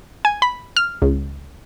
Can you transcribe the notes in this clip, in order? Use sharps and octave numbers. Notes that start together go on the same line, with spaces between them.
G#5
B5
F6
C#2